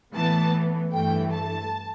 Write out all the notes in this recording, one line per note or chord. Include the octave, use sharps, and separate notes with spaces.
A2 E3 B3 A5
G2 E3 A3 G5
A5